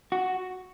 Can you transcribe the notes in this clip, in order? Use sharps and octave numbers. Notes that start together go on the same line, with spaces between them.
F#4